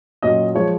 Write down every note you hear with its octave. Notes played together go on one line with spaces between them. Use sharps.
A#2 F#3 C#4 D#5
F3 G#3 C#5